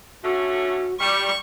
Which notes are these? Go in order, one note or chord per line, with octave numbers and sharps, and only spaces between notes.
D3 A3 C#4 F#4
G3 C#6